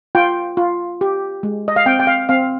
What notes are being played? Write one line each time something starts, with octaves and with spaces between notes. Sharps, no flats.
F4 G5
F4
G4
G#3
D#5
F5
C4 G5
G5
F5
C4 F5